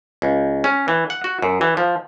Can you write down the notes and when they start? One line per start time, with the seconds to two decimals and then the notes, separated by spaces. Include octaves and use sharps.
0.22 C#2
0.64 C#4
0.88 E3
1.10 F#5
1.24 F#4
1.42 F#2
1.61 E3
1.77 F3